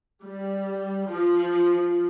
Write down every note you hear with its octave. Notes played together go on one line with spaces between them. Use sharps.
G3
F3